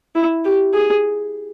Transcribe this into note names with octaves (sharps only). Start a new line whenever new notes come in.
E4
G4
G#4